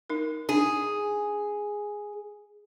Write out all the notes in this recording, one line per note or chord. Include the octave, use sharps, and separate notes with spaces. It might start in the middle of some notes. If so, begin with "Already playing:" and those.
D#4 A#4
D4 D#4 G#4